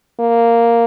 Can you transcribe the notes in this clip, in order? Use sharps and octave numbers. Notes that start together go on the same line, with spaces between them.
A#3